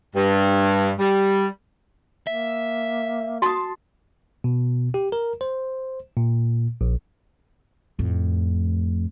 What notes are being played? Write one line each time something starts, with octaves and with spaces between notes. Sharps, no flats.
G2
G3
A#3 E5
F#4 A5 C6 D#6
B2
G4
A#4
C5
A#2
A#1
F2 A2